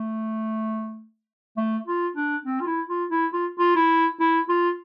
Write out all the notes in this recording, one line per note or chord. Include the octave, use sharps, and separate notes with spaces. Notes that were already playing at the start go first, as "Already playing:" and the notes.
Already playing: A3
A3
F4
D4
C4
F4
E4
F4
E4
F4
F4
E4
E4
F4